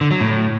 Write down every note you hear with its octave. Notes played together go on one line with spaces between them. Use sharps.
D3
F#3
A2